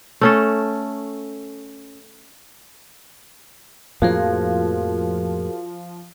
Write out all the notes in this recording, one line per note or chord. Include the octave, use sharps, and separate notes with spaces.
A3 C#4 A4
F2 A2 F3 A#3 F#4 G#4 A#4